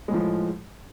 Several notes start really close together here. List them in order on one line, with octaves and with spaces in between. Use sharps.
G#3 A2 F3